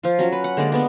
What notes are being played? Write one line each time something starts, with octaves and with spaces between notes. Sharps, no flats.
F3 F4
F#3 C#4
B4
F#5
D3 G#3 A#3 D5
G#3 B3 D4